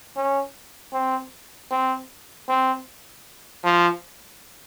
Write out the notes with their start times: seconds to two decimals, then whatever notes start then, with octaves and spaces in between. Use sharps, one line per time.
0.16 C#4
0.93 C4
1.71 C4
2.49 C4
3.64 F3